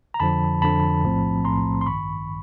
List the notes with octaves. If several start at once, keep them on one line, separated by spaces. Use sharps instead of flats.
A#5
F2 D3 F3 A5 B5
F2 D3 F3 A5 B5
B1 A2 F3 A3 C4
B1 A2 F3 A3 C4 A#5 C6
C6
A1 G2 D#3 B5 C#6